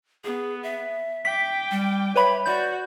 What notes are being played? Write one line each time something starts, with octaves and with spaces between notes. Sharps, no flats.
B3 G#4
E5
G5 D6 B6
G3
B4 C#5 E5 B5
F#4 D5 G6